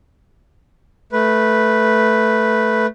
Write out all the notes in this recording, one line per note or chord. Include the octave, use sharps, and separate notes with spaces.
A3 B4